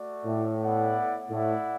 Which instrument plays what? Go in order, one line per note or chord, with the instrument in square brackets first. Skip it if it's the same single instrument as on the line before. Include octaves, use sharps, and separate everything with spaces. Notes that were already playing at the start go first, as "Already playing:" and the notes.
Already playing: [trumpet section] A3 F#4 D5
[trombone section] A2
[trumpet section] B3 E4 D5 F#5
[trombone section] A2 [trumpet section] E4 D5 F#5